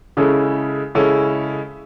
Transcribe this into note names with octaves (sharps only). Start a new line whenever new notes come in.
C#3 G#3 C#4 E4 A4
C#3 G#3 C#4 E4 A4